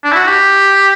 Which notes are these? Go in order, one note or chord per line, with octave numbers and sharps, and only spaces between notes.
D4
E4
F#4
G4